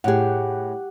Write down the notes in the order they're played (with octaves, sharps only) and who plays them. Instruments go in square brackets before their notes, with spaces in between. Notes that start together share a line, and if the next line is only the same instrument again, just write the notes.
[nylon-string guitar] A2 G#4 [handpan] G4 F#5